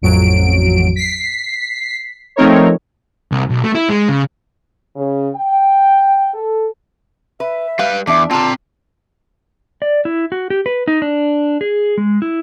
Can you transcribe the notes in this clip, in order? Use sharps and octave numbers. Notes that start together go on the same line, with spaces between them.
A1 F2 F#3 D7
B6 C7
F3 A3 C4 D#4 A#4 C#5
C2
B1
A3
E4
G#3
C#3
C#3
G5
A4
B4 E5
G3 B4 F5
E2 D4 E5 D6
D3 C4 F4 A5 A#5
D5
E4
F#4
G4
B4
D#4
D4
G#4
G#3
E4